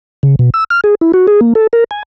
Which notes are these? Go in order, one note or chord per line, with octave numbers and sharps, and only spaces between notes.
C#3
B2
E6
F6
G#4
E4
F#4
G#4
A#3
A4
A#4
G#5